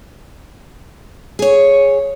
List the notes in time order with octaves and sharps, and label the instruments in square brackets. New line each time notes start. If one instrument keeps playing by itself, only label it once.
[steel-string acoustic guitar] G#4 C#5